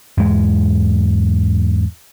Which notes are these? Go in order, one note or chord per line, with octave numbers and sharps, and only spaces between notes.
E2 G#2 G#3